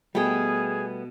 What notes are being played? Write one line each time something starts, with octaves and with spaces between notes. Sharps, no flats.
B2 G3 A3 B3 G#4 G5